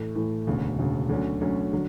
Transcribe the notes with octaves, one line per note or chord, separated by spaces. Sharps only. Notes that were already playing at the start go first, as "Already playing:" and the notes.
Already playing: A2 E3 A3
A2 E3 A3
E1 D2 C#3
E1 D2 C#3
D2 D3 F#3 C#4
D2 D3 F#3 C#4
D3 F#3